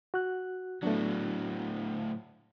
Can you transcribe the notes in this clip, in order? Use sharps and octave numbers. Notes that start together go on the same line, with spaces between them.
F#4 F#6
A2 F#3 A3 B3 D4